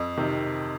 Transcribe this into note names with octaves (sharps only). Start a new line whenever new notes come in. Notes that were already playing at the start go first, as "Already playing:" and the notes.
Already playing: F2
C3 D#3